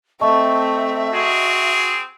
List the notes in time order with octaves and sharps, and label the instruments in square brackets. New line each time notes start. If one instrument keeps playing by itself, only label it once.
[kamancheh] A3 C4 [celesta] D#5 A5 C#6 [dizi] E5
[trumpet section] C4 G#4 [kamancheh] F#4